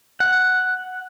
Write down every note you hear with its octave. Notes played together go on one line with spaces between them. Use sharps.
F#5